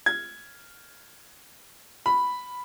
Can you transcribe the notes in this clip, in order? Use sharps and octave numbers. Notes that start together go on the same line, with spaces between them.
G#6
B5